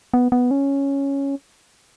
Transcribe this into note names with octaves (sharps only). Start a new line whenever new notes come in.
B3
B3
C#4